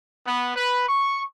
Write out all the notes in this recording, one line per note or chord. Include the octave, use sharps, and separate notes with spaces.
B3
B4
C#6